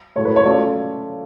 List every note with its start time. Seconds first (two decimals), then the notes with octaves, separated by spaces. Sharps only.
0.16 A2 F#3 A3 C#5
0.25 B4
0.36 C#5
0.45 F#3 A3 C#4 F4 D5